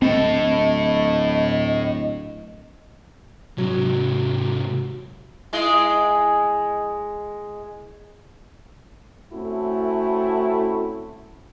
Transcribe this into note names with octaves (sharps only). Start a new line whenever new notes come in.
D1 A2 C4 A4 D#5
G#2 C3 F#3
G#3 E4 D#5
A3 C4 C#4 E4 F#4